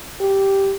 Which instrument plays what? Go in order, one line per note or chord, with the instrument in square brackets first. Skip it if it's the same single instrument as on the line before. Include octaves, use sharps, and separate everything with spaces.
[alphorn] G4